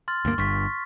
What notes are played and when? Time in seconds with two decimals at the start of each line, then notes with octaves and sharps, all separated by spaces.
0.08 C6 F6 A6
0.25 D2 G2 A#3
0.38 G1 G2 C#6 B6